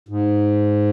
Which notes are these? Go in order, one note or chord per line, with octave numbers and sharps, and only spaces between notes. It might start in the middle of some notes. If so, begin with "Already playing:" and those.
G#2